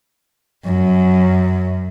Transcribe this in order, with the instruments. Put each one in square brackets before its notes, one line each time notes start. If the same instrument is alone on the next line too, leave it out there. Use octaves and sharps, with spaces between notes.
[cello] F#2